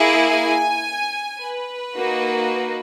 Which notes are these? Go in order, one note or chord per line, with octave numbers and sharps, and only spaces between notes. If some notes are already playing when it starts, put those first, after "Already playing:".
Already playing: A#3 E4 G#4
G#5
B4
A#3 D#4 F#4